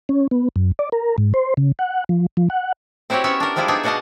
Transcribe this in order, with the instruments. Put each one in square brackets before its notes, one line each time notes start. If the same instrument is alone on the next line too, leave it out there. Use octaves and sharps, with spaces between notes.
[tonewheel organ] C#4
B3
F#2
D5
A#4
G#2
C5
C#3
F#5
F3
F3
F#5
[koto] C4 E4 F#4 G4 C#5
B3 C#4 C#5 E5
D4 A#4
F3 G3 G#3 E4 F4
B3 D4 D#4 G#4 E5 G#5
B2 D4 F#4 D#5 F5 F#5